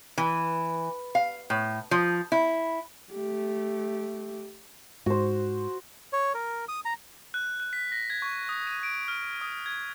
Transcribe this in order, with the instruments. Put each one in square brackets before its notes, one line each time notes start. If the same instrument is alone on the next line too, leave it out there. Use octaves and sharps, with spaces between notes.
[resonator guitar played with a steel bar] E3
F5
A2
F3
E4
[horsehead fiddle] A3 G4
[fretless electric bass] G#2 [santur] F#4 C5
[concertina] C#5
A#4
D#6
A#5
[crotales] F#6
F#6
B6
A#6
G#6
C#6
D#6
D#7
D7
F6
D#6
G#6